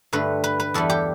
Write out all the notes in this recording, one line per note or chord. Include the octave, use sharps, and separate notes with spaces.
G2 D3 A3 B4
B4
B4
E2 E3 G3 A4
G4